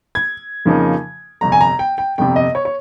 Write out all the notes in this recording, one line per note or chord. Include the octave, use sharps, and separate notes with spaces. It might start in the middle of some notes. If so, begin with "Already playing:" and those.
G#6
F2 C#3 F3 A#3 D#4
G1 F2 C3 A#5
G#5
A#5
G5
G5
G1 F2 C3 G5
D#5
C#5
C#5